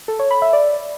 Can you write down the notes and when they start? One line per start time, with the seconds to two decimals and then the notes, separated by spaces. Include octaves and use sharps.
0.08 A4
0.19 C#5
0.31 B5
0.42 E5
0.53 D5